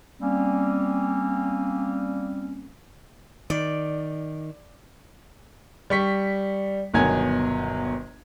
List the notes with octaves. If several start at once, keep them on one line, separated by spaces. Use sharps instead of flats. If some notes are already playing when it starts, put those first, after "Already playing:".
G3 A#3 C4 C#4
D#3 D5
G3 C#6 B6
G1 B2 D#3 F#3 G#5 G#6